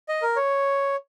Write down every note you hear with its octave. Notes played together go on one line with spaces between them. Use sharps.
D#5
A#4
C#5